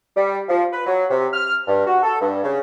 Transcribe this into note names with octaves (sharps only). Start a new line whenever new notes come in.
G3
F3
B4
F#3
C3
F6
G2
F#4
A4
G2
C#3